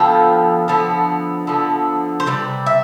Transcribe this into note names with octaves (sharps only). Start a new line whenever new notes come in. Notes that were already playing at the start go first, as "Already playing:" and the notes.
Already playing: D3 F3 B3 E4 G5
D3 F3 B3 E4
D3 F3 B3 E4
C5
C3 G3 B3 D5
E5